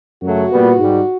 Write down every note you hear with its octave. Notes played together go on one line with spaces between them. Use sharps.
F#2 C#3 F#3 A3 F#4
A#2 G3 B3
G#2 D#3 G3